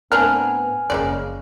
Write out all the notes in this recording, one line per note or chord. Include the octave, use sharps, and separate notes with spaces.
D1 A2 B3 C4 D4 A#4 G#5 F6
F#1 F2 C#3 G#3 A#3 D5